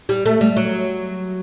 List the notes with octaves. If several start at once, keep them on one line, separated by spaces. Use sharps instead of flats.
G3
A3
G3
F#3